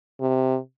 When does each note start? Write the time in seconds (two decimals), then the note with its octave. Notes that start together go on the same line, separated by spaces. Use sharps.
0.21 C3